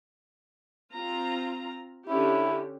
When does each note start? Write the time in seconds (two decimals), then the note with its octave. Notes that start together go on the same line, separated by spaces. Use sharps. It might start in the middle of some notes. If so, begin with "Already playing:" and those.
0.93 C4 F4 A#5
2.09 D3 C#4 E4 G4